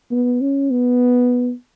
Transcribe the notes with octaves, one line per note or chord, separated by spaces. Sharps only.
B3
C#4
B3